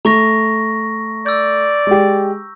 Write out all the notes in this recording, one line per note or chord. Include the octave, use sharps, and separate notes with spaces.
A3 A#5 C#6 A#6
D5 E6 G6
G#3 G4